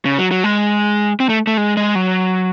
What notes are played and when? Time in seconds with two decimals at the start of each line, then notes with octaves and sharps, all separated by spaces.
0.05 C#3
0.19 F#3
0.31 F#3
0.44 G#3
1.20 C4
1.29 A3
1.47 A3
1.57 G#3
1.77 G#3
1.95 F#3